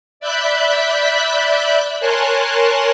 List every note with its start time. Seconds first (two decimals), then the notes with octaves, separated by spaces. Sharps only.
0.20 D5 E5 B5 F#6 G6 B6
2.00 A#4 C#5 G#5 A5 C6 F#6